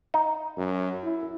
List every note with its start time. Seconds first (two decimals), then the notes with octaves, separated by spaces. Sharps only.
0.14 D#4
0.58 F#2
1.03 E4